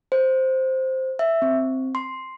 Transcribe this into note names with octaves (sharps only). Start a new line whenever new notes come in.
C5
E5
C4
C6